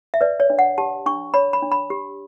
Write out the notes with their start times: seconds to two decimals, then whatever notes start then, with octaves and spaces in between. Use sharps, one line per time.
0.14 E5
0.21 B4 D5
0.40 C#5
0.50 D4
0.59 F#5
0.78 G4 A5
1.06 D4 C#6
1.34 C#5 B5
1.53 B5
1.62 D4
1.72 B5
1.90 G4